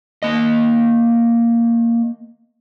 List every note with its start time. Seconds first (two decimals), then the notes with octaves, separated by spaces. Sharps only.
0.23 A#3 D#5